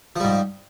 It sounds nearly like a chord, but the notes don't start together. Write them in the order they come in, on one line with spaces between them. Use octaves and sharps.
F3 G3 G#2